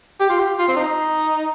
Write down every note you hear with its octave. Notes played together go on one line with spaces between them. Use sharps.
G4
F4
G4
F4
C4
D#4